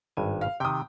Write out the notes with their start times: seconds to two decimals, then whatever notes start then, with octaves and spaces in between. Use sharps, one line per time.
0.17 G#1 G2 G#5
0.41 F5
0.60 C3 D#3 G5 D#6